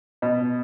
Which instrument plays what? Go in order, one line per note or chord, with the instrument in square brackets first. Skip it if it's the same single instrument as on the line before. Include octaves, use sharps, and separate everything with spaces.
[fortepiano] B2